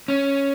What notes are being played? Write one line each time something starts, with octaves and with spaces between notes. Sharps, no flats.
C#4